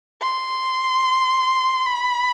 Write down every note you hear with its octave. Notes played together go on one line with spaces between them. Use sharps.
C6
B5